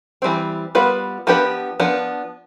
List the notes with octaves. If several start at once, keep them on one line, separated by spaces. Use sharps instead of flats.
E3 G3 C4
G3 B3 F4 B4
F3 B3 D4 G4 B4
F3 B3 D4